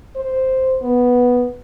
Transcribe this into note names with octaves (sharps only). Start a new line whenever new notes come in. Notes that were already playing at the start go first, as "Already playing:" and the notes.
C5
B3